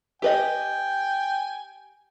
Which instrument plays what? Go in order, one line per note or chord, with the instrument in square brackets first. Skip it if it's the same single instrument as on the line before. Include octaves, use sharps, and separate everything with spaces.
[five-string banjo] G4 B4 D#5 [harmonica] G5 G#5